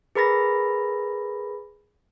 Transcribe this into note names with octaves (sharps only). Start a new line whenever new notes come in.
G#4 A#4 B4 B5 A6 A#6